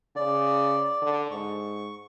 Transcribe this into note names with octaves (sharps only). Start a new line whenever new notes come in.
C#3 D5
D3
G#2 C#6